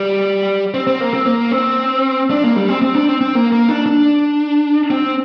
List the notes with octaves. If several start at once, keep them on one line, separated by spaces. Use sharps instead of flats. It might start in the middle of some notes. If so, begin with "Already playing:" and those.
Already playing: G3
C4
C4
A#3
C4
A#3
C4
D4
A#3
G3
C4
C4
D4
C4
C4
A#3
A#3
D4
D4
C4